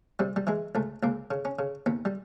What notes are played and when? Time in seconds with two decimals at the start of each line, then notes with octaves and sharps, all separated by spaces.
0.19 C3 G3
0.36 G3
0.47 E3 G#3
0.75 C#2 A3
1.03 C#2 A#3
1.31 C#3
1.45 C#4
1.59 C#3
1.86 D#2 B3
2.05 G3